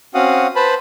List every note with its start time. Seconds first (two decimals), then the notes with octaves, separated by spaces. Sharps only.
0.14 C4 C#4 F#4 F5 F#5 D#6
0.56 B4 C5 A5 B5